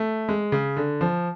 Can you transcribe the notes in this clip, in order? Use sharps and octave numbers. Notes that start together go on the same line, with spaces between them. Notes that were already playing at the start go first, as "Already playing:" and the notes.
Already playing: A3
G#3
C#3
D3
F3